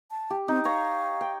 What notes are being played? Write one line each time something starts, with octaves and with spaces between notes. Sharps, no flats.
A5
G4
C4 D#4
C#5 F5 A#5
G5